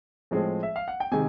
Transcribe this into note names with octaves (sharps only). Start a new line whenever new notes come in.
A2 F3 G#3 C4
E5
F5
F#5
G5
C3 D#3 G#3 G#5